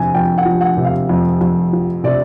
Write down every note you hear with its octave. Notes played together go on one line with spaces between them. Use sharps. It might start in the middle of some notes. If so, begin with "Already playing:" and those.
Already playing: F2 C3 G#5
F2 G5
F#5
F3
F#5
C3
F5
F2
F2
F3
C3 D5